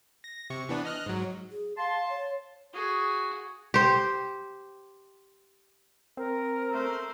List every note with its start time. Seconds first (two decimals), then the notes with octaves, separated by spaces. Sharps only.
0.24 A#6
0.50 C3 C#6
0.69 E3 B3 D4
0.85 D#5 F6 F#6
1.06 G#2 F#3
1.51 G#4
1.77 F5 A5 C6
2.09 C#5
2.73 F#4 G#4
3.74 G4 C5
6.17 C4 A#4
6.70 A3 C5